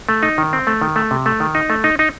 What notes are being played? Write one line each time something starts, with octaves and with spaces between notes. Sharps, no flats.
A3
D#4
D#3
C4
A3
D#3
A3
C3
A3
D#3
D#4
A3
D#4
D#4